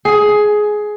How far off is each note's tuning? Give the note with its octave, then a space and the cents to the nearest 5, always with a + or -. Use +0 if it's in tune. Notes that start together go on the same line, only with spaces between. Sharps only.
G#4 +15